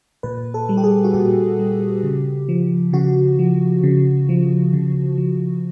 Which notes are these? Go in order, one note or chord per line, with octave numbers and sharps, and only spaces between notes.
A#2 B4
A4
G3
G4
G#4
F#4
A#2 G4
G3
C#3
F3
C#3 F#4
F3
C#3
F3
C#3
F3